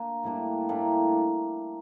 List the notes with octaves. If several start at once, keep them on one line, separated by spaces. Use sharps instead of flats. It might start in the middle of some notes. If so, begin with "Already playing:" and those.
Already playing: A#3 D4
A2 G3 A#3 D4
A2 G3 A#3 D4